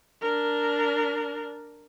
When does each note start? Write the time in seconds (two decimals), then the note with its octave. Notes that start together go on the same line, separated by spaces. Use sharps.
0.22 D4 A#4